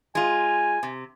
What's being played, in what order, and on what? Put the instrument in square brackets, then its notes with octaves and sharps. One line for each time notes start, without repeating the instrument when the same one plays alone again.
[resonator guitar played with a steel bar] G#3 F4 [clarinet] G#5
[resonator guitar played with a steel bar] C3